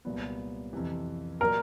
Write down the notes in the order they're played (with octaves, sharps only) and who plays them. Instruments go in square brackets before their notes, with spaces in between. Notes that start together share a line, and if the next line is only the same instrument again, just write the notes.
[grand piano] C2 A#2 F#3 B3
F2 C3 E3
[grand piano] A#2 F#3 A#3 [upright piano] A#4